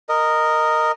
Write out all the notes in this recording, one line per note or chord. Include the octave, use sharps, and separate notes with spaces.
A#4 D#5